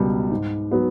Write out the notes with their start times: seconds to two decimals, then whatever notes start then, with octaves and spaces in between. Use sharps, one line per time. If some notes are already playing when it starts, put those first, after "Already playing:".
Already playing: C#2 B2 G3
0.31 G#2
0.72 F#3 B3